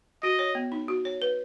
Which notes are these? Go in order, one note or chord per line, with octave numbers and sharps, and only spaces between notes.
F#4 D#5
C#5
B3
D#4
F#4
C#5
B4